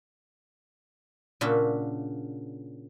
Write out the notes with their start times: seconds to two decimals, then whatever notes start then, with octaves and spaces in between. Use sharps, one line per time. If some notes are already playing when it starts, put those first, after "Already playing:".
1.41 A#2 C#3 D4 F#4 E5